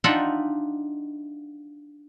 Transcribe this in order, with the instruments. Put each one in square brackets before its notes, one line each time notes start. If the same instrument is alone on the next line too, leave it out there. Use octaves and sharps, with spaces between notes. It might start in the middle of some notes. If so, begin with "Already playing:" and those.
[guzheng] D4 D#4 F4 E5 F#5 G5